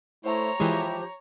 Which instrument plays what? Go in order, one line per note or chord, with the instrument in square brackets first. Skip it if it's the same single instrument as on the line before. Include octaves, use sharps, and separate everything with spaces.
[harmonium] A3 E4 [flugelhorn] C5 [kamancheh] C#5 A#5
[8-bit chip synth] E3 G#3 [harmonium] F3 G4 [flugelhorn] E4